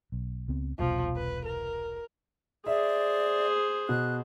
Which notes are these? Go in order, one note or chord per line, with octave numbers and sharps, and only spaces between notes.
B1
C#2 B3 C4
E1 C2 B2 F3
B4
A#4
G#4 C5 D5 E5
B2 F#6